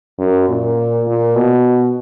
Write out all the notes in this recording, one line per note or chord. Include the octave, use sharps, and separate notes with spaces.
F#2
A#2
A#2
B2